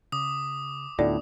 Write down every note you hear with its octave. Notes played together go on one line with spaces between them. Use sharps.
C#3 D6 D#6
D2 A2 B3 D#4 F4 D5